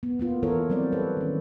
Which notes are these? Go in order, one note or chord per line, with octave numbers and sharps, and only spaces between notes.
B3
A#3 B3 F4
E3 E4 F4 A4 A#4 C#5
F#3 G3 C4 C5 D5
A4 B4 C#5
D#3 C#4